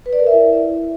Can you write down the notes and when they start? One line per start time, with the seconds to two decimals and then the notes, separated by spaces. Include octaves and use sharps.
0.06 B4
0.13 D5
0.20 A#4
0.26 E5
0.33 E4